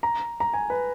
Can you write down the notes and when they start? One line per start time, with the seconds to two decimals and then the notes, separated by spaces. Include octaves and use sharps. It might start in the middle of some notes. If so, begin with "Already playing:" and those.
0.03 A#5
0.40 A#5
0.54 G#5
0.70 B4